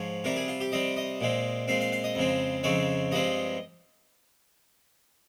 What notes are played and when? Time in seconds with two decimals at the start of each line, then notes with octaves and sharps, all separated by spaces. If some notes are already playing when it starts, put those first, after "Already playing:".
Already playing: G#2 F3 C#5
0.24 C3 G3 C4 A#4
0.36 G#4
0.48 F4
0.60 G4
0.72 C3 G3 C4 D#5
0.97 D#5
1.21 A#2 G#3 C4
1.68 A#2 G#3 C4 F5
1.81 F5
1.92 F5
2.04 D#5
2.15 F2 C#3 G#3 C4
2.63 F2 C#3 G#3 C4 C#5
3.11 G2 F3 G#3 C4 D#5